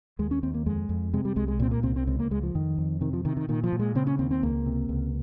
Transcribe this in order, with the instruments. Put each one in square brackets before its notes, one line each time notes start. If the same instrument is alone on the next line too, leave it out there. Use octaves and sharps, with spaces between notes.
[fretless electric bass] D#2 G#3
C#4
D#2 C4
A#3
F2 G#3
F2
C3 G#3
G3
C2 G#3
G#3
A#2 C4
A#3
C2 C4
C4
C#2 C4
A#3
C#2 G#3
F3
F2 D#3
F2
C3 D#3
F3
C3 D#3
D#3
A#2 D#3
F3
A#2
G#3
C#3 C4
C#4
D#2 C4
C4
C#2 A#3
C3
C#2